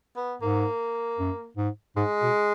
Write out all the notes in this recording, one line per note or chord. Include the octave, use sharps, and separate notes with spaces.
B3
G#2 A#3
F#2
G#2
G#2 G#3
B2